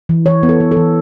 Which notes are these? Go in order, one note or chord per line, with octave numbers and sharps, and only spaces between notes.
E3
E3 C#5
B3
A4
B3
A4
E3